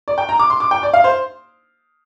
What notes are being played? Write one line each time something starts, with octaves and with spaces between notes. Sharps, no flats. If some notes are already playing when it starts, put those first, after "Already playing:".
D5
G5
A#5
D6
C6
D6
G5
D5
F5
C5